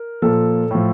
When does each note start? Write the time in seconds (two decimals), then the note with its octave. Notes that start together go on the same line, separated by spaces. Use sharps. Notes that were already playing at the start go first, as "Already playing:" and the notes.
Already playing: A#4
0.22 A#2 F3 A4
0.71 A2 F3